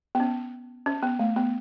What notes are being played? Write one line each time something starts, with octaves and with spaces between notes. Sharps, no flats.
B3
C#4
C#4
B3
A3
B3